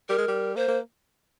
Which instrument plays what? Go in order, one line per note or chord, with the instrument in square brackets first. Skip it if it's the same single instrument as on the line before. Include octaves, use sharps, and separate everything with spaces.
[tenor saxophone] G3 [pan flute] A#4
[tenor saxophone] G#3
G3
[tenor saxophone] A#3 [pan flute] C5
[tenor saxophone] A#3